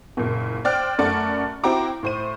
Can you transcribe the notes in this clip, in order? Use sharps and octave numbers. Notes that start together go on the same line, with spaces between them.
F#1 A#2
C5 D5 G5 F6 F#6
F#2 A3 D5 F#5 A5
C4 E4 F#4 G5 A#5 D6
A2 C5 D#7